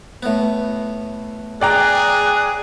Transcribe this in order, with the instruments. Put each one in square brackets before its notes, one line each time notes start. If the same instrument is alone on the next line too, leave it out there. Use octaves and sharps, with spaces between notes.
[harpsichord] A2 B3
[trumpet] G#4 [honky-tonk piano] D5 G5 A#5 [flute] F#6